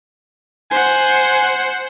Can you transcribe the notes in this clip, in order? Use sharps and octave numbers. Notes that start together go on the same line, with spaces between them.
C5 F#5 G#5